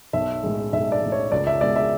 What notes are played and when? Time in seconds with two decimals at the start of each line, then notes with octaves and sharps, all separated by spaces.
0.13 B1 E5
0.43 A2 G#3
0.73 B1 E5
0.92 D5
1.02 A2 G#3
1.12 C#5
1.32 C#2 D5
1.47 E5
1.61 B2 G#3 D5
1.76 E5